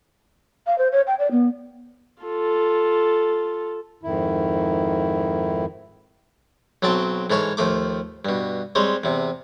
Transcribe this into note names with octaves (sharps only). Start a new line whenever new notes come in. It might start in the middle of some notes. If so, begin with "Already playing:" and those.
F5
C5
C#5
G5
D5
B3
F4 A4
F2 G#2 D#3 E4
B1 F#3 C4 G5 A5
G#2 E3 A4 C#5 F5 C#6
D#2 F3 A3 D6
G2 B2
G3 G#3 C4 C#5
E2 C3